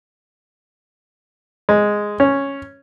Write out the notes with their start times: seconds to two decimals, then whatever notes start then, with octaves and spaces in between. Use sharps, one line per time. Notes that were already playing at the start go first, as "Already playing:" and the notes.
1.69 G#3
2.20 C#4